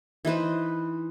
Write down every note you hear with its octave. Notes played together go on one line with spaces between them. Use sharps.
E3 D#4 B4 C5